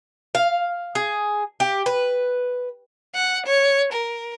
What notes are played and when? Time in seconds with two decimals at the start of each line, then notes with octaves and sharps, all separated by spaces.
0.35 F5
0.95 G#4
1.60 G4
1.86 B4
3.15 F#5
3.47 C#5
3.93 A#4